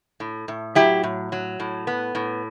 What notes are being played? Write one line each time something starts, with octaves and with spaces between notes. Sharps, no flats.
A2
A2
F#3 E4 G4
A2
F#3
A2
B3
A2